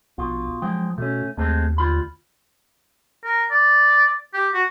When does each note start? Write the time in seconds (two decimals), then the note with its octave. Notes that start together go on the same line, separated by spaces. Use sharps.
0.18 A#1 B2 F4
0.62 F#2 F3 G#3 G5
0.98 B2 A3 C#4
1.37 D#2 G#3 A3 C4
1.78 D2 F4 B5
3.24 A#4
3.51 D5
4.34 G4
4.54 F#4